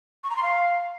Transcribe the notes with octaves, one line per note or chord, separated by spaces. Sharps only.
C#6
A#5
C6
F5